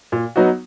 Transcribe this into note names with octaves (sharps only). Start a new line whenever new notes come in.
A#2
F#3 B3 D#4 F#4